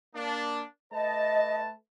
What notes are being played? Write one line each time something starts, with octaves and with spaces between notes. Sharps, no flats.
A#3 D4
A3 B4 D#5 A5